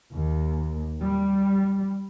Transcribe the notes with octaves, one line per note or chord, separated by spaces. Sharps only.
D#2
G3